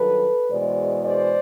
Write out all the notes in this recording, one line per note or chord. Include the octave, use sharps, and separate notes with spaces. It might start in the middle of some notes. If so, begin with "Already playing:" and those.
Already playing: G2 D#3 F#3 A4 B4
E2 B2 G#3 C5 D5
C5 D5